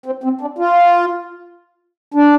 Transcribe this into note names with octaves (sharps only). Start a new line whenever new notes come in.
C4
C4
D4
F4
D4